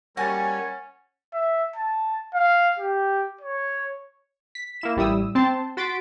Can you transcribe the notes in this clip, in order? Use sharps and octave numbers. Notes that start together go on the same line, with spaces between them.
G3 A#3 C#4 F#4 F#5 G#5 A6
E5
A5
F5
G4
C#5
B6
A#3 E4 E7
A1 G3 E4 D#6 E6
C4 A5 C6
F#4 C6 A6 B6 D7